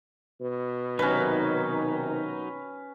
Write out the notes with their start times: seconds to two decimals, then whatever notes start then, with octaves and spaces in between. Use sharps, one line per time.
0.41 B2
0.99 C3 D#3 F#3 C#4 D#4 B4